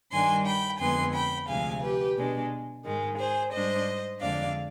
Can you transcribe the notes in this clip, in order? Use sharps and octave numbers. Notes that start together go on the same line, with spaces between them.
G2 D#3 G3 D4 G#5 C6
G5 B5
F2 D3 G#3 B3 G#5 C6
G5 B5
D2 C3 F3 G#3 F5 G#5
G4 B4
B2 G#3 D4
G#2 D#3 G#3
G#4 C5
G#2 G3 D4 C5 D#5
F2 D3 G#3 D4 D5 F5